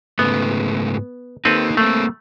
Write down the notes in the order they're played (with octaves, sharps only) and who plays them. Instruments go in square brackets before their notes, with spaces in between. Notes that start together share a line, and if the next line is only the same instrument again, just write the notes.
[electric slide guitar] G#2 C#3 A3 [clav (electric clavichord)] B3
[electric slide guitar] A#3 D#4 [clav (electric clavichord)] C4 A4 B4
[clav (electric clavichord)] A3 [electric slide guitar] A#3 C4